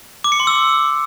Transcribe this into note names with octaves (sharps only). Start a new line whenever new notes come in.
D6
C#7
C6
E6